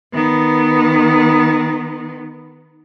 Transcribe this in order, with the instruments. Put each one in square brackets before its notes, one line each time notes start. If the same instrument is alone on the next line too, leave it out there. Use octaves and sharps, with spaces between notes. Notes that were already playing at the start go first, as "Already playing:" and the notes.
[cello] D#3 B3